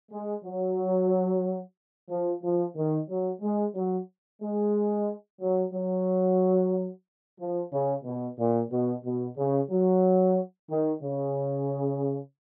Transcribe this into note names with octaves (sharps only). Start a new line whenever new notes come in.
G#3
F#3
F3
F3
D#3
F#3
G#3
F#3
G#3
F#3
F#3
F3
C#3
B2
A#2
B2
B2
C#3
F#3
D#3
C#3